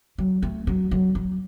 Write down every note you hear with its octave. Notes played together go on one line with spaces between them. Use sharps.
F#3
A3
F#3
F#3
F#3